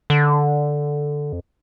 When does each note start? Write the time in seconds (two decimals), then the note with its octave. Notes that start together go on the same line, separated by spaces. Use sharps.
0.10 D3
1.33 F2